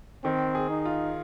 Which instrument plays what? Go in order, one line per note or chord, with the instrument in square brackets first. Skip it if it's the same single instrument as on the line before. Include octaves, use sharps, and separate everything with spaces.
[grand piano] D#3 [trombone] C4
[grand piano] G#4
[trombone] D#4
[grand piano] F4